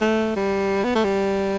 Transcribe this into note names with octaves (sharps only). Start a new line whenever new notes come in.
A3
G3
B3
A3
G3